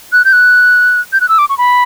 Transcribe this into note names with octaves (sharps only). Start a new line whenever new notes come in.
F#6
G6
F#6
G6
F#6
E6
D6
C#6
B5